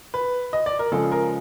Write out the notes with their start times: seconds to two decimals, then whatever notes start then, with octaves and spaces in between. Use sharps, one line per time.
0.14 B4
0.53 D#5
0.66 D5
0.79 A#4
0.92 C#3 F3 G#3 A4
1.12 A#4